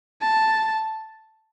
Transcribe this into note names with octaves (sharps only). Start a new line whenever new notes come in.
A5